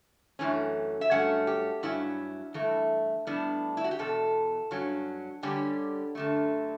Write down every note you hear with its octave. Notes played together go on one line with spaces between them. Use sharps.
F#2 E3 A3 C#4
E5
G2 F#3 A3 C#4 F#5
G4
G2 F#3 C#4 E4
G2 E3 A3
A2 G3 B3 D4 E4
E4
F#4
G4
E2 B2 A4
G2 F#3 C#4
D3 G3 C#4 G4
F#2 D3 A3